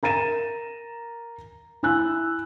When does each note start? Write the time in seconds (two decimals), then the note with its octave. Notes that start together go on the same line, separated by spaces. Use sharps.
0.03 A#4 A#5 A6 D#7 E7
1.83 E4 G#5 E6 F#6